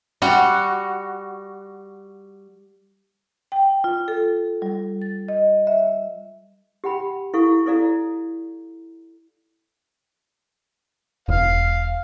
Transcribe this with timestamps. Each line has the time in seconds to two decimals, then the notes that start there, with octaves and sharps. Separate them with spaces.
0.22 G3 F#4
3.52 G5
3.84 F4
4.08 A4
4.62 G3
5.02 A6
5.28 D#5
5.67 E5
6.84 G4 F#5 G5 B5
7.34 E4 A4 F5 C#6
7.66 E4 A4 D5 F5 A#5
11.28 E1 F5